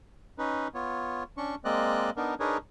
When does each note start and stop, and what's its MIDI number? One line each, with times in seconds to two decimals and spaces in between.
0.38 0.68 61
0.38 0.68 63
0.38 0.68 71
0.74 1.23 59
0.74 1.23 65
0.74 1.23 73
1.37 1.55 61
1.37 1.55 62
1.37 1.55 85
1.65 2.10 56
1.65 2.10 58
1.65 2.10 60
1.65 2.10 74
1.65 2.10 75
1.65 2.10 90
2.17 2.34 59
2.17 2.34 62
2.17 2.34 63
2.17 2.34 70
2.40 2.57 62
2.40 2.57 63
2.40 2.57 68
2.40 2.57 70
2.40 2.57 71
2.40 2.57 73